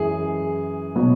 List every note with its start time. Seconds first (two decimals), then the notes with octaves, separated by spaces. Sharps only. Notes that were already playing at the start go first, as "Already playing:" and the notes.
Already playing: F#2 E3 G#3 G#4
0.95 B2 F#3 B3